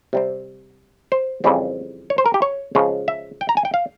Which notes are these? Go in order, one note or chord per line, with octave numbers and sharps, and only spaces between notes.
C3 G3 C4
C5
F2 C#3 E3 G3 C4
C#5
C5
A#4
G4
C#5
C#3 F3 G#3 C#4 F4
E5
G5
A#5
G#5
G5
F5